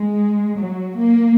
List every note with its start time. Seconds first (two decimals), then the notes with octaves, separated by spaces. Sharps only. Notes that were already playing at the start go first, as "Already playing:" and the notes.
Already playing: G#3
0.57 F#3
0.96 A#3